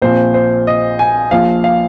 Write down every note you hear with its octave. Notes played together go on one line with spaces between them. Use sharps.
A#1 A#2 F3 C4 C5
C5
D#5
G#5
A#1 A#2 F3 F5
F5